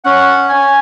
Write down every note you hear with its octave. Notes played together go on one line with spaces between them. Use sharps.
C#4 F#5
G#5